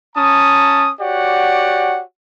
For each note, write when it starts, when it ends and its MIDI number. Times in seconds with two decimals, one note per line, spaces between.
0.16 0.91 61
0.16 0.91 81
0.16 0.91 82
0.16 0.91 87
1.00 2.02 66
1.00 2.02 67
1.00 2.02 73
1.00 2.02 74
1.00 2.02 78